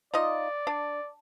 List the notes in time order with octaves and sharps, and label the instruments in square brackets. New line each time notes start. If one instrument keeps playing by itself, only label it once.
[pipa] D#4 F4 D#5 [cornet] D5
[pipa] D4